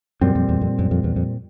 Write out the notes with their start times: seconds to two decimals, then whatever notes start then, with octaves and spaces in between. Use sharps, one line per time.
0.21 F#2 A#2 G3 C4
0.35 F2
0.49 E2
0.61 F2
0.79 F#2
0.91 F2
1.04 E2
1.16 F2